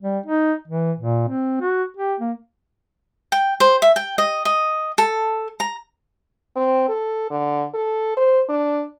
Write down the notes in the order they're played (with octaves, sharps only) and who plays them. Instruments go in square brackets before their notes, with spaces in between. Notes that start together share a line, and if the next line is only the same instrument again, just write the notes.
[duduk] G3
D#4
E3
A#2
C4
F#4
G4
A#3
[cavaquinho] G5
C5
E5
G5
D#5
D#5
A4
A#5
[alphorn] C4
A4
D3
A4
C5
D4